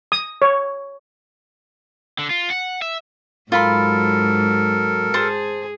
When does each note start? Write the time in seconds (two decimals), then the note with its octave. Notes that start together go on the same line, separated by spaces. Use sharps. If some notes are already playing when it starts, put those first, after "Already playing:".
0.12 D#6
0.42 C#5
2.19 D3
2.30 F4
2.50 F#5
2.82 E5
3.52 G#2 F#3 F4 A4 A#4 B5 C6
5.14 G#4 C5 A5